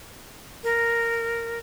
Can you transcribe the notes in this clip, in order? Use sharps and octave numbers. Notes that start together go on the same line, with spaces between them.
A#4